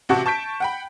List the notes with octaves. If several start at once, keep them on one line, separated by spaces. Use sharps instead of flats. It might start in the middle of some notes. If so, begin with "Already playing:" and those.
A1 C3 F#4 F#5 A5 C#6
A5 C#6 G6 B6 D7
F#5 G5 B5